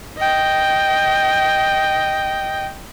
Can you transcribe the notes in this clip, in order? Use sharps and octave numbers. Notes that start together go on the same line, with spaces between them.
D#5 G5